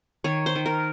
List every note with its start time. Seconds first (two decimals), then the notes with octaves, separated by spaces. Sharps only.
0.24 D#3 C#5
0.46 C5
0.55 D#3
0.66 A#4